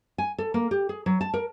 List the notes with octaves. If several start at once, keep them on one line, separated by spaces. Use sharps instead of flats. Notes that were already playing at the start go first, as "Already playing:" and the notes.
G#5
A4
A#3
G4
G#4
F#3
A5
A#4